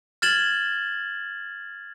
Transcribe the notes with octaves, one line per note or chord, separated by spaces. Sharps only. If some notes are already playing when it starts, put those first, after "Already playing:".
F6 G#6 A6 E7 F#7 G7